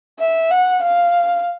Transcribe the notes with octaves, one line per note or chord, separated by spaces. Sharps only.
E5
F#5
F5